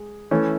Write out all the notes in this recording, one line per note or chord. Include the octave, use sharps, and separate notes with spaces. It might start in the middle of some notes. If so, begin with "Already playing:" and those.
Already playing: G#3
E3 A3 C#4